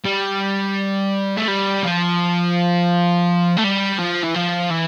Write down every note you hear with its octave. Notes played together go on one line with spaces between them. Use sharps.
G3
A3
G3
F3
A3
G3
F3
E3
F3
E3